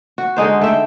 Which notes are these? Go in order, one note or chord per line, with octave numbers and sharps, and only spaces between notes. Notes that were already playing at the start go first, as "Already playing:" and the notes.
F#4
D3 G#3 D#4 C5
A3 E5 G5